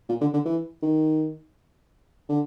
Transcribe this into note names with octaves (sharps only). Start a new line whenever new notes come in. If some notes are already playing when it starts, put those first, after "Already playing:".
A#2
D3
D3
E3
D#3
D3